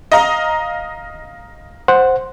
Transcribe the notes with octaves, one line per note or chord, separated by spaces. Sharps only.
D#5 F5 A#5
C5 F#5